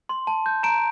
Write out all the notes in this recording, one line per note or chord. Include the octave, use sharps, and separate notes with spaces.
C6
A5
G6
A#5 D7